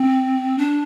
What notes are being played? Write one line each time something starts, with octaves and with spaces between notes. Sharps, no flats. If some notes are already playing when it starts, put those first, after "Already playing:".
Already playing: C4
D4